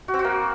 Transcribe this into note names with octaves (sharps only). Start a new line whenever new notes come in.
F#4
C4
F#4
A#3